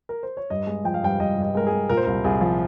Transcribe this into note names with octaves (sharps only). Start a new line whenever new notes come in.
A#4
C5
C#5
G2 D#5
G#3
F3 G5
F5
G2 G5
G2 D#5
G2
D#5
G#3 A#4
G#4
G#3
A#2 A#4
C5
C2 A#4
C2 G#4
F3